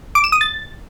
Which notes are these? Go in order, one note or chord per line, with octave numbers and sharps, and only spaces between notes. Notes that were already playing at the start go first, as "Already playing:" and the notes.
D6
E7
D#6
A6